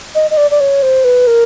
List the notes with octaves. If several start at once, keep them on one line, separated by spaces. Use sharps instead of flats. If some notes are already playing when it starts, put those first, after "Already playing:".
D#5
D#5
D5
D5
C#5
C5
B4
A#4